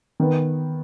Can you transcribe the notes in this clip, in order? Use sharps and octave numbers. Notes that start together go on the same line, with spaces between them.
D#3 B3